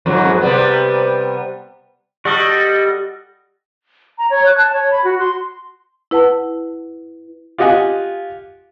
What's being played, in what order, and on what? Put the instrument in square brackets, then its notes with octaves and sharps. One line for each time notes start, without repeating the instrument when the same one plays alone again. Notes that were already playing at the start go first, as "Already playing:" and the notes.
[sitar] F2 G#2 F#3
C3 G3 B3
[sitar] G3 [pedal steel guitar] F#4 A4 D#5
[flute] A#5
C#5
F#6
A5
C#5
B5
F#4
C6
[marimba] E4 B4 F#5 A5
[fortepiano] F4 G4 D#5 F#5 G#5